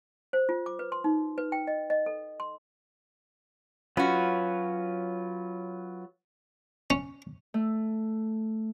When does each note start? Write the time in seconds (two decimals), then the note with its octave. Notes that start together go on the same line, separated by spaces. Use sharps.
0.33 C5
0.49 F4
0.66 D6
0.79 B4
0.92 C6
1.04 D#4
1.38 B4
1.52 G5
1.67 D#5
1.90 D#5
2.06 A4
2.40 C6
3.97 F#3 C#4 F4 F#4 B4
6.90 C#4
7.54 A3